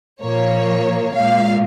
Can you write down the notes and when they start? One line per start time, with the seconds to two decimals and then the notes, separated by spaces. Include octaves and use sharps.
0.22 A#2 F3 A#3 C#5
1.15 A#2 G#3 F5